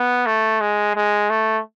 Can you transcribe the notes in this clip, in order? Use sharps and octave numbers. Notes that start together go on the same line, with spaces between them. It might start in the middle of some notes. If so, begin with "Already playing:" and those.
Already playing: B3
A3
G#3
G#3
A3